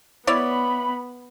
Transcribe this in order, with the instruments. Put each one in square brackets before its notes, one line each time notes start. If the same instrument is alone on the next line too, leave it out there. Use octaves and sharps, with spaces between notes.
[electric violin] B3 [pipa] E4 C#5 D5 [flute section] B5